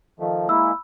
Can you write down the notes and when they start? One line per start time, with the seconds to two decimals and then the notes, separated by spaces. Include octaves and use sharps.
0.20 D#3 F3 A3
0.49 G#3 A#3 E4 B5 E6